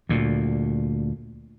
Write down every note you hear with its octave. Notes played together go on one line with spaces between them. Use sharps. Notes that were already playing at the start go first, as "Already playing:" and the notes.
D2 A#2